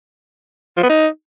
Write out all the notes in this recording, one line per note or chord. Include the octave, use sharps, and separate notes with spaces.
F3
B3
D#4